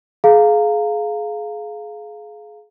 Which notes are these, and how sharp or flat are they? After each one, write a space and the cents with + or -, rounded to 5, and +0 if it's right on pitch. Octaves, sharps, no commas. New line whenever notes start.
G#4 +30 F5 +0 A#5 -20